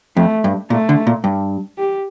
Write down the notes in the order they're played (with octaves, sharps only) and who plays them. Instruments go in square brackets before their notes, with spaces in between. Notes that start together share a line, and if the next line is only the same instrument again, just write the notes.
[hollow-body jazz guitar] F2 [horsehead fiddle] A3
[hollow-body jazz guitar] G2
[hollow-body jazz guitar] A#2 [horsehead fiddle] A3
[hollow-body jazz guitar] D3
A#2
G2
[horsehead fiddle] G4